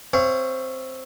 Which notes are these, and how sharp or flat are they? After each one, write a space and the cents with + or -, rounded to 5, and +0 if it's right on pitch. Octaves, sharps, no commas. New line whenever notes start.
C4 +0 C#5 +0 F5 -45